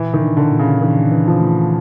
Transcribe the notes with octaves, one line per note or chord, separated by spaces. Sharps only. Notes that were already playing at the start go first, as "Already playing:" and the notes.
Already playing: A#2 E3
D#3
D4
D3
A#2
C#3
D#3 E3
E3
F3
A3